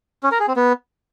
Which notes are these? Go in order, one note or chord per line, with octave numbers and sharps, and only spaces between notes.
C#4
A#4
G#4
C4
B3